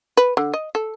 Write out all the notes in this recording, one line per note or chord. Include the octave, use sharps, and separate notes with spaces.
B4
D3
D#5
A4